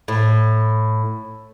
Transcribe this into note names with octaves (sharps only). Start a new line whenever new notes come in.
A2